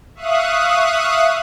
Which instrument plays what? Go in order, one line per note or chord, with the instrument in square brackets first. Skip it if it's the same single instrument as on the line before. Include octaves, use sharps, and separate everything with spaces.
[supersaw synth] E5 F5 C#6 D#6 F#6